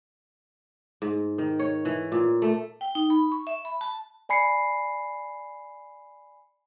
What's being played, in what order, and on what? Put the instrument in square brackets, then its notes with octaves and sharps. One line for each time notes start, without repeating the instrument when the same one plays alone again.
[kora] G#2
D#3
C#5
E3
A#2
A3
[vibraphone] G5
D#4
B5
C#6
E5
B5
A5
[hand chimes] D5 G#5 B5 C7 C#7